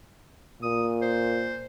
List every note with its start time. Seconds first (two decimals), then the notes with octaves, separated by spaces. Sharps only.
0.62 A#2 D#6
1.02 C5